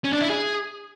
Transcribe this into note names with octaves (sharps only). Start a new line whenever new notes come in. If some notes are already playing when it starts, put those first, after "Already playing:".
C#4
D4
E4
G#4